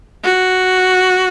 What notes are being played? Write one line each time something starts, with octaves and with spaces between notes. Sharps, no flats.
F#4